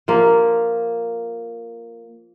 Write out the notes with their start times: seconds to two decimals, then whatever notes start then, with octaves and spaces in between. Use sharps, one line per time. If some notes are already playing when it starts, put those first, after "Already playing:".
0.08 F3 A#3